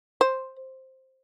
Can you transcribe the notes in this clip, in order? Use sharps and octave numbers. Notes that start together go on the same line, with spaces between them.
C5